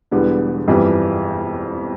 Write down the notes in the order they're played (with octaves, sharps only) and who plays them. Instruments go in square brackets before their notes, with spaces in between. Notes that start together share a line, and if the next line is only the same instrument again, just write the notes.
[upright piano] E1 E2 D3 G3 B3
G1 F2 E3 G3